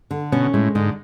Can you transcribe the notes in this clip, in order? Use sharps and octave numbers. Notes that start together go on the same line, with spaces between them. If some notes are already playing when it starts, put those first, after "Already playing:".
D3
B2 C#4
A2 G#3
G#2 D3